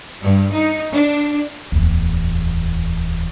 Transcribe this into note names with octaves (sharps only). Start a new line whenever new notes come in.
G2
D#4
D4
D1 E2